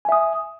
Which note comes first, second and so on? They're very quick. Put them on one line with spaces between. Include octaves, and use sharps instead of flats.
G#5 E5 D#6